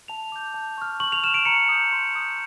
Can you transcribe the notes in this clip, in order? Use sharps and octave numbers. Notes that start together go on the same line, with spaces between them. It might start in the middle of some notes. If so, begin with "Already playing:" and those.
A5 F7
D6 G6
A5
C#6 F6
C#6 F#7
F7
F6 E7
D7
A#5 C#7
D#6 G6
C6
D#6 G6